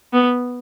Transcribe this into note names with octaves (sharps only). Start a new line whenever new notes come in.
B3